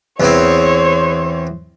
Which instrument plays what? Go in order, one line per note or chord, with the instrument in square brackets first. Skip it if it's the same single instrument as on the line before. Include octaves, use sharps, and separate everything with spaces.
[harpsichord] E2 E3 C4 [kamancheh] C5 C#5